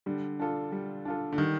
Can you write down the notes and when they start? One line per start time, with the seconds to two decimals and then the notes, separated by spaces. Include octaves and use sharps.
0.06 D3 G3
0.39 D4 F4 A4
0.72 G3
1.05 D4 F4 A4
1.32 D3
1.38 D#3 G3